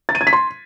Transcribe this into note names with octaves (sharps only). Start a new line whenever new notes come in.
A6
D#7
G#6
B6
C6